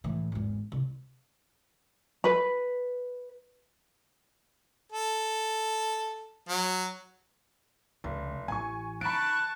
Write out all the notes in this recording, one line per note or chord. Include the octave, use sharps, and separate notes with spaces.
A2 E3
G#1 E2
C2
B4 B5
A4
F#3
F1 C#2
A1 G#5 C#6
D#3 A5 B5 C#6 F#6 D7